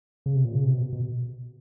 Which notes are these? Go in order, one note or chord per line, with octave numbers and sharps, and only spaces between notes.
C#3
C3
A#2
C#3
C3
B2
B2